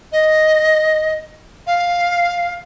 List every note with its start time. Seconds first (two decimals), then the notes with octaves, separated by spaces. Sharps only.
0.12 D#5
1.67 F5